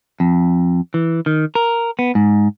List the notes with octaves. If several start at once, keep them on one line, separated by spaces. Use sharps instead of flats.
F2
E3
D#3
A#4
B3
G#2